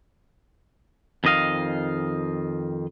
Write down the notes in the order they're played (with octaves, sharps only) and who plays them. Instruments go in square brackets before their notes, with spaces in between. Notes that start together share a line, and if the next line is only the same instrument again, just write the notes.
[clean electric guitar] F2 D#3 D#5 F5